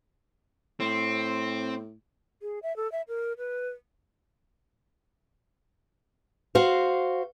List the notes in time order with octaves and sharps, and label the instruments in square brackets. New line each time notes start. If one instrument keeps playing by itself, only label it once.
[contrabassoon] A2 [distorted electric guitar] C4
[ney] G#4
E5
A4
E5
A#4
B4
[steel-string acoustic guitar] F#4 C5 F5